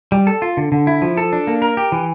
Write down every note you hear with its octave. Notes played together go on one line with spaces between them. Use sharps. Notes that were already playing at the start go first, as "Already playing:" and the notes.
G3
A4
F4
D3
D3
E4
F3
A4
D4
A#3
A#4
G4
E3